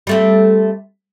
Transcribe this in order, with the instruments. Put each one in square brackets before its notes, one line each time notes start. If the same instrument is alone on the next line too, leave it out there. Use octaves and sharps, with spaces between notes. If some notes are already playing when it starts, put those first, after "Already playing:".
[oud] G3 A3 C4